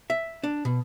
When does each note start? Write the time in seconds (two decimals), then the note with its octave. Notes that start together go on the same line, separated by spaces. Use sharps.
0.10 E5
0.44 D4
0.65 B2